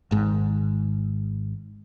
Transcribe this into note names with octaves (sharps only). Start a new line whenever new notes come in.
G#1 G#2